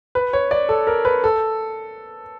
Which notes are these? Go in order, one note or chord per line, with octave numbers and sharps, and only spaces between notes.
B4
C#5
D5
A4
A#4
B4
A4